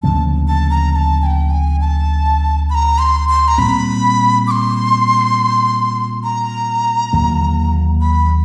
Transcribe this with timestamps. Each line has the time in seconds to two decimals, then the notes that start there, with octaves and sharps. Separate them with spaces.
0.03 D2 C#3 F3 A#3 A5
0.48 A5
0.70 A#5
0.92 A#5
0.96 A5
1.22 G#5
1.26 G5
1.50 G#5
1.81 A5
2.70 B5
2.75 A#5
2.99 C6
3.29 C6
3.48 A#5
3.58 A#2 G3 C4 B5
4.47 D6
4.51 C6
6.24 A#5
7.13 D#2 D3 F#3 A#3
8.01 B5